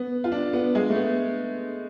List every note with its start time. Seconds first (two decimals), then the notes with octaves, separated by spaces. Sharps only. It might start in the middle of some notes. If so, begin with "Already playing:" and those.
Already playing: B3
0.24 F4
0.32 D4
0.53 B3
0.75 G#3
0.90 A3
0.96 B3